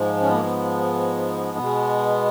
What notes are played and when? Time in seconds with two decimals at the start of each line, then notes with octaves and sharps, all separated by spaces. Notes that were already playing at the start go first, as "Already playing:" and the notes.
Already playing: G#2 F3 G#3
0.21 C#4
0.28 B3
0.34 A#3
0.43 B3
1.58 B2 G#3